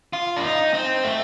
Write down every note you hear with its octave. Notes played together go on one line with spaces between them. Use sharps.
F4
D4
D#4
C4
A3